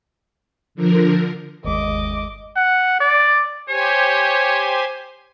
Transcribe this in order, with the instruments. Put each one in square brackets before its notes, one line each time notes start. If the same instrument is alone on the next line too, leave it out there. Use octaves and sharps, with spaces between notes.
[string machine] D3 F3 A#4
[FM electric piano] G1 D#2 G#3 [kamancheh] D#5 D6
[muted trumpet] F#5
D5
[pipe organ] G4 C5 G#5 [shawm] C#5